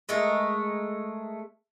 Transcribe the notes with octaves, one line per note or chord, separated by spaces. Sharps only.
G#3 A3 A4 A#4